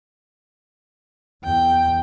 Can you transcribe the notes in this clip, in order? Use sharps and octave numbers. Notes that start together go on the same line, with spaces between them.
E2 G5